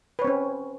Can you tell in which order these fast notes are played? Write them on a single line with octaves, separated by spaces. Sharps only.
B4 C#5 C4 C#4